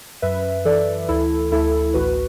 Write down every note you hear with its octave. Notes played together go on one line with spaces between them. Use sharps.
F#2 B4 E5
E3 A4 D5
D2 E4 A4
D2 E4 A4
A1 F#4 B4